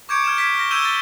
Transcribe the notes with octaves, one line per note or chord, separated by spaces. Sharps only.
C#6 D6 G6 G#6 C#7 D7
F6 G6 G#6 E7
F6 G#6 B6 D7
F6 A#6
E6 G6 G#6 D#7 E7 G7
A6